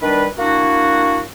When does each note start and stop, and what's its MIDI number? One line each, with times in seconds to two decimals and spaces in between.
0.02 0.27 51
0.02 0.27 55
0.02 0.27 62
0.02 0.27 71
0.38 1.20 58
0.38 1.20 62
0.38 1.20 64
0.38 1.20 66